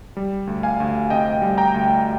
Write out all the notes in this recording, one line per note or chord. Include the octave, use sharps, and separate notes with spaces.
G3
D2
F5 G#5
D2
C3 D#5 G5
G3
G5 A#5
D2